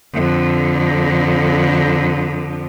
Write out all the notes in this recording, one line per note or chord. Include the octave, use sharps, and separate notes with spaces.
F2 D3